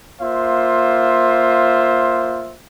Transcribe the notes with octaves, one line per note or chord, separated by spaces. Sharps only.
A#3 F4 C5 E5